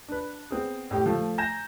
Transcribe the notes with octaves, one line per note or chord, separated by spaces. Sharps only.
D4 B4
B3 C4 G#4
A2 G4
F3 A3
G#5 A#5 G6 A#6 E7